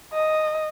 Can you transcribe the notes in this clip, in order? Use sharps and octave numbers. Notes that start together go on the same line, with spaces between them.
D#5